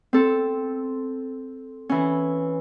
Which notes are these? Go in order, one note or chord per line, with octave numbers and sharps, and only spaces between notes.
C4 A4
E3 C#4